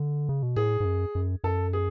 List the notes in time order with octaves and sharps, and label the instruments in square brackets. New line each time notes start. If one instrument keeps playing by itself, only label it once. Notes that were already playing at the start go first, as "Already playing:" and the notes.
Already playing: [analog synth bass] D3
C#3
B2
[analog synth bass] A2 [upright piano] G#4
[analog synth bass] G#2
F#2
F#2
[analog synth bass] F#2 [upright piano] A4
[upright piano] G#4